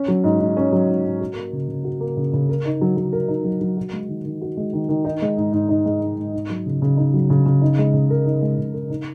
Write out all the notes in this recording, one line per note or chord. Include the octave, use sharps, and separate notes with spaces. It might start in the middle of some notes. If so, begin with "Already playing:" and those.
Already playing: C#4
F#3
G#2
G#2
C#4
F#3
G#2
G#2
F#4
A#3
C#3
C#3
F#4
A#3
C#3
C#3
A#4
D#4
F#3
F#3
A#4
D#4
F#3
F#3
F#4
G#3
D#3
D#3
F#4
G#3
D#3
D#3
D#4
G#3
G#2
G#2
D#4
G#3
G#2
G#2
D#4
F#3
C#3
C#3
D#4
F#3
C#3
C#3
D#4
G#3
C#3
A#4
D#4
G#3
C#3
A#4
D#4